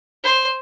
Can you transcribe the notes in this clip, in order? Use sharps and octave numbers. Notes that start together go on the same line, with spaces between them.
C5